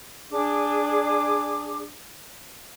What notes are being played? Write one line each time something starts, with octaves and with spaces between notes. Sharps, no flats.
D4 G#4 D6